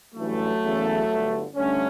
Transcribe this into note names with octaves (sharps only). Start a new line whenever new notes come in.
A1 G2 E3 F#3 A3
F#1 E2 C#3 E3
G1 G2 D3
G2 D3 A3 C#4